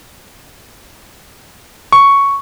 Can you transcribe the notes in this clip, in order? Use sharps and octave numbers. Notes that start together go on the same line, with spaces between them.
C#6